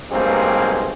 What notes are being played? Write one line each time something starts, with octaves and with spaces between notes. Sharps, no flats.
B1 G2 G#3 A#3 C4